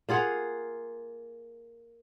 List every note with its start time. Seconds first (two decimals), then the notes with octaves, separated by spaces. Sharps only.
0.09 A#3 F4 G#4 F#5